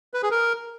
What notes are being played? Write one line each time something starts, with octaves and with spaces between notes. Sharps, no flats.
B4
G#4
A#4